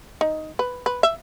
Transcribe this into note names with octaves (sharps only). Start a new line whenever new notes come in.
D#4
B4
B4
E5